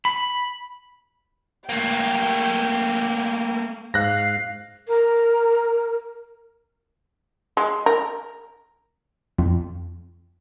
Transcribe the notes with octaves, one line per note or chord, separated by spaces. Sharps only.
B5
A3 A#3 G5
G#2 F5 F#6 A#6
A#4
G#3
A#4
F2